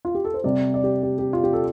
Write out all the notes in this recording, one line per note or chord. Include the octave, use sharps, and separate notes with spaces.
F4
G4
A4
C5
C3 G3 D5
D5
G4
G4
G4
F4
G4
A4